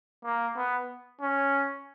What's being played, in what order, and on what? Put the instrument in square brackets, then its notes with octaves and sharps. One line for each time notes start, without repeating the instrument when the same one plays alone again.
[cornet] A#3
B3
C#4